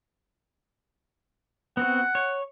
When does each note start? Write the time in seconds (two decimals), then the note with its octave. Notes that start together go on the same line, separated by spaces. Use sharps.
1.77 B3 C4 F#4 F#5
2.15 C#5